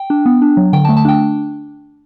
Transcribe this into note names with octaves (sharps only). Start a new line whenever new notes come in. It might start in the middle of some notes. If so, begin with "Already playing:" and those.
Already playing: G5
D4
B3
D4
F#3
D3 G5
A5
A3
A5
D4 G5